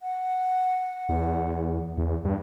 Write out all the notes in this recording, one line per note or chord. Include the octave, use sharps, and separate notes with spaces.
F#5
E2
E2
G2